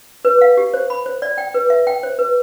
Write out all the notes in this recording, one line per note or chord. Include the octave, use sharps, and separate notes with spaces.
B4
F5
G4
C5
B5
C5
D5
G5
B4
E5
G5
C5
B4